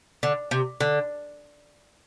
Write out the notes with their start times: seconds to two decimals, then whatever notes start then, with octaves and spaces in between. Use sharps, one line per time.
0.23 D3
0.51 C3
0.80 D3